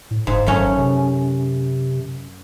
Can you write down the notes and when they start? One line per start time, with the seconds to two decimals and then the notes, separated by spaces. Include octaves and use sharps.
0.11 A2
0.27 F#1 G#2
0.46 G#1 F#2 A3 C#4
0.78 C3